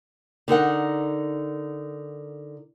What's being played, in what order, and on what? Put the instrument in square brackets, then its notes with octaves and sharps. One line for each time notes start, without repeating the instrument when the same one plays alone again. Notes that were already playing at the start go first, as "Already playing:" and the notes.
[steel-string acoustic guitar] D3 D#4 A#4 F#5